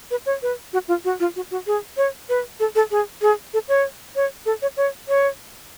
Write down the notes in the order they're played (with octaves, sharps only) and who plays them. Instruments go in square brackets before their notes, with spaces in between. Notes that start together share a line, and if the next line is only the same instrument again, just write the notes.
[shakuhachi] B4
C#5
B4
F#4
F4
F#4
F4
F#4
F#4
G#4
C#5
B4
A4
A4
G#4
G#4
A4
C#5
C#5
A4
C#5
C#5
C#5